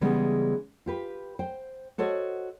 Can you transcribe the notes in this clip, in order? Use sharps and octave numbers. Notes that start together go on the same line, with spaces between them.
C#3 E3 G3 G#3 B3
F4 G4 B4
C5 G5
F#4 A4 C5 C#5 D#5